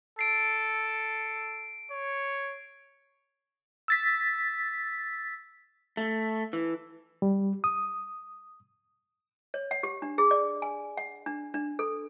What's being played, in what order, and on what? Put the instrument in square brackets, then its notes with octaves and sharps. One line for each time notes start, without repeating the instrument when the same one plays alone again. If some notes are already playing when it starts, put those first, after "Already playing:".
[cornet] A4 [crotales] C7 D7
[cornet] C#5
[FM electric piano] E6 A6 B6
[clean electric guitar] A3
E3
[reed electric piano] G3
D#6
[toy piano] C#5
F#5
G4
D4
G#4
D5
G#5
F#5
D4
D4
A4